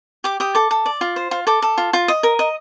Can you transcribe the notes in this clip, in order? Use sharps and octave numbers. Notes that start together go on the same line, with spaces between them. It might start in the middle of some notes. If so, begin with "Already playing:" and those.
G4 D6
G4 D#6
A4 D6
A4
D5
F4
C5
F4
A4 D6
A4
F4
F4
D#5 D#6
A#4
D#5